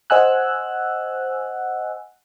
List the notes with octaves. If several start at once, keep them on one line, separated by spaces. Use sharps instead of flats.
C5 D#5 F#5 G#5 E6 F#6